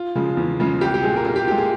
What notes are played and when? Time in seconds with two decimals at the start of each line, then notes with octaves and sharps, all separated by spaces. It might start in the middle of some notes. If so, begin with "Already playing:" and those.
Already playing: F4
0.15 C#3 F3 G#3
0.37 E2
0.60 C#3 F3 G#3
0.81 C2 G4
0.94 G4
1.03 A#2 G#3 G#4
1.16 A#4
1.25 C2 G#4
1.36 G4
1.47 A#2 G4
1.52 G#3
1.58 G#4